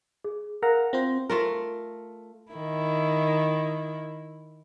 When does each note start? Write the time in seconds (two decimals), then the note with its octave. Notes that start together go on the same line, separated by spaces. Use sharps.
0.24 G#4
0.62 A#4 F5 F#5 A#5
0.93 C4 F4 C5 A#6
1.30 A3 F4 A#4
2.52 D#3 E4